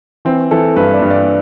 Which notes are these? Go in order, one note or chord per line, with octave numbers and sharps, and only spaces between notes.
E3 C4
E3 A4
G2 B4
D5
G2
D5